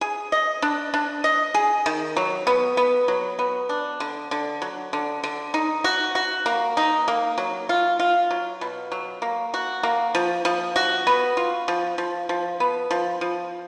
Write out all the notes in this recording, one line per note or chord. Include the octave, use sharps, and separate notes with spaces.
G#4
D#5
D4
D4
D#5
G#4
D#3
F#3
B3
B3
F#3
B3
D4
D3
D3
F#3
D3
D3
D#4
F#4
F#4
A#3
D#4
A#3
F#3
F4
F4
F#3
B2
F#3
A#3
F#4
A#3
F3
F3
F#4
B3
F4
F3
F3
F3
B3
F3
F3